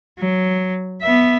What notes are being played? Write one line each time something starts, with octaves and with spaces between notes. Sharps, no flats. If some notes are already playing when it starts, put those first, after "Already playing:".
F#3
B3 E5